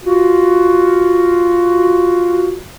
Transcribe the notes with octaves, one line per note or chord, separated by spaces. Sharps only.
F4 F#4